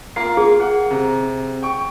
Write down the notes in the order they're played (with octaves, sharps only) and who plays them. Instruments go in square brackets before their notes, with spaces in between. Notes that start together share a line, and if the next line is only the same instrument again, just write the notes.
[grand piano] A#3 F4 A#4 [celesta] C7
[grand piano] A#3 [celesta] G#4
[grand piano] F#5
C3 A#5
G5 C#6